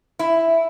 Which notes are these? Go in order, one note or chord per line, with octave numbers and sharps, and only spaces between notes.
E4